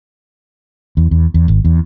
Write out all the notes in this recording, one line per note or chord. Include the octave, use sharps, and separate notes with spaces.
E2
E2
E2
G#1
E2